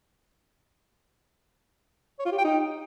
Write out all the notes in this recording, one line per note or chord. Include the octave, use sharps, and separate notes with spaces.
C#5
F4
G4
G5
D#4